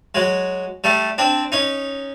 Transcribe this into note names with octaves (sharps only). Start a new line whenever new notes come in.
F#3 G#3
G3 A3
C4 D4
C#4 D#4